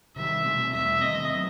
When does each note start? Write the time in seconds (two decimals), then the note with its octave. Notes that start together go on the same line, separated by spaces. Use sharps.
0.16 C3 D#3 G3 E5
0.45 B2 A3 C4
0.73 E2 B2 G3 C4 E5
1.01 C3 D#3 A3 C4 D#5
1.31 C3 F#3 B3